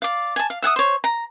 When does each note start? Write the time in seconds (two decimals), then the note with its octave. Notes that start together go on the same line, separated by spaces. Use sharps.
0.02 D5 F5
0.36 G#5 A5
0.50 F5
0.62 E5 F#5 G#5 D#6
0.76 C5 C#5
1.04 A#5